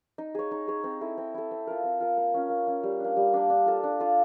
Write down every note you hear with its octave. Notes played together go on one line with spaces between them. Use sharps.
D#4
G#4 C#5
D#4
G#4 C#5
C4
E4 A4
C4
E4 A4
C4
F4 A#4
C4
F4 A#4
A#3
C#4 F4
A#3
C#4 F4
G3
A#3 D4
G3
A#3 D4
D4
F4 A4
D4
F4 A4